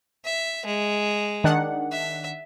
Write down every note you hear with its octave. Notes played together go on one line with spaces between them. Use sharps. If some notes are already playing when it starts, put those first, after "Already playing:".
E5
G#3
D#3 D4 F#5
E5